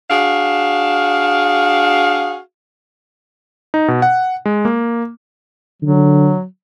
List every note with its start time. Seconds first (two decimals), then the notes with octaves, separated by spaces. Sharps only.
0.09 D4 F#4 G#4 F5
3.74 D#4
3.88 B2
4.02 F#5
4.46 G#3
4.65 A#3
5.82 D3 F#3